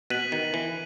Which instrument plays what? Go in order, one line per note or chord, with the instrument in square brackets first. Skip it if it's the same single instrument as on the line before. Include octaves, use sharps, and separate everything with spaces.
[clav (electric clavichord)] B2 [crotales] F#6 B6 D#7 F#7
[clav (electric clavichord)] D#3
E3